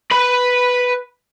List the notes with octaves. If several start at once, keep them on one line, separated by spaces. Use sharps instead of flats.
B4 B5